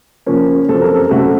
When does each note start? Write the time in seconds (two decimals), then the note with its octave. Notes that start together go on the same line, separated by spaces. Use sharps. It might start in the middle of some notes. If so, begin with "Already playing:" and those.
0.26 C#3 F3 A#3 C#4
0.69 F#2 F3 C4 A4
0.82 A#4
0.94 A4
1.11 F#2 C#3 A3 C4 F#4